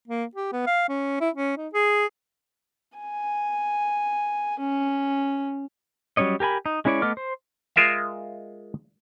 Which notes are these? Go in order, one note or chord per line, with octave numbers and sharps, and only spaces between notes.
A#3
G4
B3
F5
C#4
E4
C#4
D#4
G#4
G#5
C#4
F#3 G3 C#4 C#5 D#5
G4 A#4 G#5 B5
D#4
G#3 C#4 E4 C#5 D5
A3 B3 D#5 D6 F6
C5
G#3 F4 A#4 E5 F5